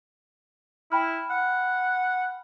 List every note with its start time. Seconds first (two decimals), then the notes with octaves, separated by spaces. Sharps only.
0.92 E4 G5 B5 F6
1.30 F#5